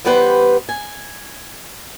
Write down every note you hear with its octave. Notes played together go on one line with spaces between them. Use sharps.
E3 G3 B3 G4 B4 C5
G#5